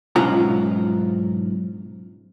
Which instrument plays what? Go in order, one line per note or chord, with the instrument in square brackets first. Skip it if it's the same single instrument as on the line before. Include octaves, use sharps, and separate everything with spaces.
[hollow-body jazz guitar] B1 G#2 C#4 F4 F#5 A#5